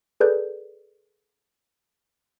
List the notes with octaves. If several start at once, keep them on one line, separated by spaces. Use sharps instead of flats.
G#4 A4 B4 D5 G6